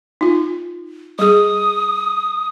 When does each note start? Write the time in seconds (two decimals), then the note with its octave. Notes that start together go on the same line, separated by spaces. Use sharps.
0.21 D#4 F4
1.19 G3 G#4 D#6